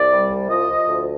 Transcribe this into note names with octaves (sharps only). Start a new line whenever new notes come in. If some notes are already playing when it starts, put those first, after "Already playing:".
Already playing: C2 D5
G3
C2
F3 D#5
F3
D2